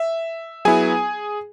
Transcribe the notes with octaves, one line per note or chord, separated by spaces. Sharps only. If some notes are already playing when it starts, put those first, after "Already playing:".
Already playing: E5
F#3 B3 E4 G#4 G#5